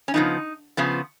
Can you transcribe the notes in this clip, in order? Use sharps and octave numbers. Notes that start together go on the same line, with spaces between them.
C#4
C#3 F3 B3 D#4
C#3 F3 B3